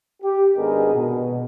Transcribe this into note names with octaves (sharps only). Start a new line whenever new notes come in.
G4
G#1 B3 D4 G#4 A#4 D#5
B2